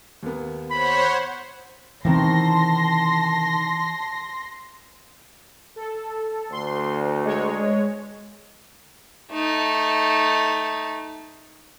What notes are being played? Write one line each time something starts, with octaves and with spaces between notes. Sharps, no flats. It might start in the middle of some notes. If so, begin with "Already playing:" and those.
D#2 A#3 B3
C5 C#5 F#5 B5
C3 D#3 E3 B3 A5 C6 A#6
A4
D2 C6
G#3 C#5
A3 D#4